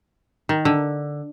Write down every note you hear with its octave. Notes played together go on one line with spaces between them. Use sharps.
D#3
D3